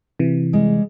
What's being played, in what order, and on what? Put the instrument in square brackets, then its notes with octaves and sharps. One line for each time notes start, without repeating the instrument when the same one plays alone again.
[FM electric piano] C3 E3
[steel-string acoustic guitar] G3 G#3